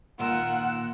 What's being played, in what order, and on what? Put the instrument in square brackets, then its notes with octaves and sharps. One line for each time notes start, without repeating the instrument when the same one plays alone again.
[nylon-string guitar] A#2 D#3 [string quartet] F4 A#4 E6 [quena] F#5